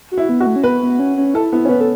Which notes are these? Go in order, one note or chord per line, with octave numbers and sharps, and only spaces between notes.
F#4
E4
B3
F#4
A3
C#4
B3 B4
B3
C#4
C#4
E4 A4
B3 E4
C#4
B3 B4
A4